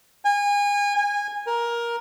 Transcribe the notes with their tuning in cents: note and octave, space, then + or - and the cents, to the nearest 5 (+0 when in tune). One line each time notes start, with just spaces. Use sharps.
G#5 -30
G#5 -20
A#4 +15